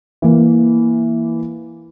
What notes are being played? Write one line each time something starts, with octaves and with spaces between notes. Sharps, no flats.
E3 A#3